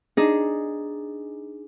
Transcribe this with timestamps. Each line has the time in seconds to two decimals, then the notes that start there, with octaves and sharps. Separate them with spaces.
0.17 D4 D#4 G#4